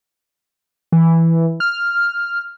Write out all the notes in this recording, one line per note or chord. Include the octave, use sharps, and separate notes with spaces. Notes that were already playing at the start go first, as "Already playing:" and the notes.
E3
F6